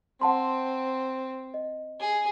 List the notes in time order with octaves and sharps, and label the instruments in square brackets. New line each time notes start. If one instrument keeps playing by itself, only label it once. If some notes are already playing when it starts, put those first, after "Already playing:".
[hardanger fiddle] C4 [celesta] F#5 A5 C6
[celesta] D#5
[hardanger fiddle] G#4